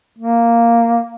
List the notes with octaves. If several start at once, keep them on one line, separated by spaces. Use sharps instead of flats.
A#3